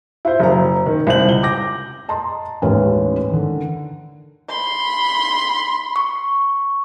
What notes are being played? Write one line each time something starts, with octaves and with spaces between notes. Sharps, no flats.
E4 F4 C5
F#1 A#5
D#3
C2 C5 F#7
C#2 G7
D6 G6 A#6
D#5 A5 A#5 C6
A1 D#2 G#3 C#4 B4
D3 D#3
B5 C6
C#6